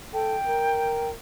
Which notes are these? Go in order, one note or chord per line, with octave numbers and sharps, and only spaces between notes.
A4 G5
A#4